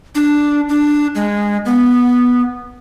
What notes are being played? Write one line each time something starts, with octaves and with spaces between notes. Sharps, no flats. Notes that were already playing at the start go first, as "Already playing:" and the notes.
D4
D4
G#3
B3